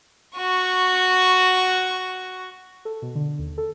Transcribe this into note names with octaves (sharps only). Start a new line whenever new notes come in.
F#4 C#6
A4
B2
D3
D#2
A4